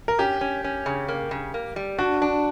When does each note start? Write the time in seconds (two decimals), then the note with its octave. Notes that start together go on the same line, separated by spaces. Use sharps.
0.08 A#4
0.19 C#4 G4
0.41 C#4
0.64 C#4
0.86 C#3
1.08 A#3
1.31 C#3
1.54 A#3
1.76 G3
1.98 D4 F#4
2.22 D4